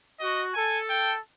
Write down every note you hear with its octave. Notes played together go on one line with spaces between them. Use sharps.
F#4 D#5
A4 G#5
G5